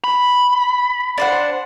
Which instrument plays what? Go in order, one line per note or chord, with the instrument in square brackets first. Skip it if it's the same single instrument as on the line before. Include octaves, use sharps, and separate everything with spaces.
[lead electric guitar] B5
[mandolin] D4 C5 F#5